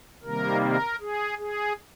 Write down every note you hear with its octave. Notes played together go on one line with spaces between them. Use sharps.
C3 D#3 G3 A#3 A#4
A#4
G#4
G#4